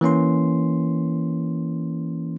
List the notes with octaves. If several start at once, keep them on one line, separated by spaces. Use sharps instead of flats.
E3 A#3 C#4 C6